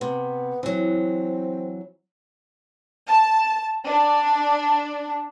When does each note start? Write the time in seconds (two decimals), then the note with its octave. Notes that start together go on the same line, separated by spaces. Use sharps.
0.01 C3 B3
0.63 E3 F#3 C4
3.08 A5
3.86 D4